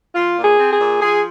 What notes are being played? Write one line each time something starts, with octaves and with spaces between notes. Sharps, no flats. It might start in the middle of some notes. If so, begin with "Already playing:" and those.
F3 F4
A#2
G#4
C4
G#4
A#2
F3 G#4